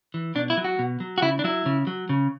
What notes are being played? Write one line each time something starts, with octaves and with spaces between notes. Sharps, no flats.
E3
B2 D4
E4
F#3
F#4
B2
F#3
F#4
C#3 E4
D4
F#3 E4
C#3
F#3
C#3